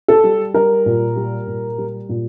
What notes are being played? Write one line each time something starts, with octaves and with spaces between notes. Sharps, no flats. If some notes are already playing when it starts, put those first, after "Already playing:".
A4
G3
G3 A#4
A#2
G3
A#2
G3
A#2